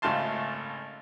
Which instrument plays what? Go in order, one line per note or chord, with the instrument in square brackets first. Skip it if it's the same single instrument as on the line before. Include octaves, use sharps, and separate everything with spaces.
[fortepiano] G#1 C#3 A3 F5 A5 C6